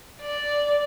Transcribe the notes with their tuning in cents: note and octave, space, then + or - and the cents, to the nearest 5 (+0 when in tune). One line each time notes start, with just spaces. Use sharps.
D5 -5